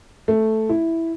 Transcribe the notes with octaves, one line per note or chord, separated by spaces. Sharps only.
A3
E4